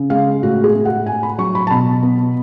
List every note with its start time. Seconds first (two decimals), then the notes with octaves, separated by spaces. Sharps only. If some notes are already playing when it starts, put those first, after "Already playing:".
Already playing: C#3
0.10 G#3 F5
0.42 A2 F#4
0.64 G#4
0.75 A3
0.85 F#5
1.06 A2 G#5
1.23 B5
1.38 F#3 C#6
1.55 B5
1.67 A5
1.70 B2 B5
2.03 B3